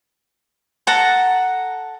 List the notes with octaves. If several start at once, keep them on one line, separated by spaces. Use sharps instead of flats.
A4 F#5 A5 A#5